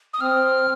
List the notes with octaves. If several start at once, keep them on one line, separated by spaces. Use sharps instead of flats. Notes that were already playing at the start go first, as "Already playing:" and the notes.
D#6
C4 F6